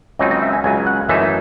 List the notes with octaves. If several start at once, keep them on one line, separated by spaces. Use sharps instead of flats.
C#2 C#3 F#3 C4 D#4 D#5
D#5
E5
G#5
C#2 C#3 F#3 G#5
F#5
F#2 E3 A3 D#4 E5